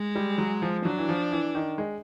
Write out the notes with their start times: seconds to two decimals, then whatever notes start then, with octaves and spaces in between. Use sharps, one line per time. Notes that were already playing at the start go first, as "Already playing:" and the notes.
Already playing: G#3
0.15 G3
0.38 F#3
0.62 F3
0.85 F#3 D4
0.98 E3
1.09 F3
1.32 E3
1.55 D#3
1.78 G#3